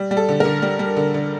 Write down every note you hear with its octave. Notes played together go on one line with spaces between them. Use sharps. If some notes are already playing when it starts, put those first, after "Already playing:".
Already playing: G3
G3
A4
D3
D3 A#4
G3
G3
D3
D3